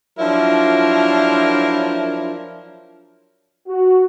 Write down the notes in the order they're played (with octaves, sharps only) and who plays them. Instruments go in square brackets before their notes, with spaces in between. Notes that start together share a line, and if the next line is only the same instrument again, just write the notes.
[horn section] F3 F#3 D4 E4 F4 A#4
[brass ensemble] F#4